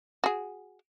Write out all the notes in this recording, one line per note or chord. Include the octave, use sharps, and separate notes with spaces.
F#4 G#4